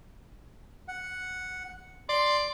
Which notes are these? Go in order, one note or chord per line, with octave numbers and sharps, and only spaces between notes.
F#5
D5 C6